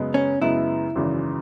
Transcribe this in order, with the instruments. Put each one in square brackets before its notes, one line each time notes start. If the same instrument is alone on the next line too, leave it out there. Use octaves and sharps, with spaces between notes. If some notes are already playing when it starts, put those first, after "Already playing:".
Already playing: [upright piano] F#2 C#3 G#3 B3
[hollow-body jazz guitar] C#4
[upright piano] F#2 C#3 G#3 B3 [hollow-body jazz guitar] E4
[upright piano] G#1 F#2 C#3 E3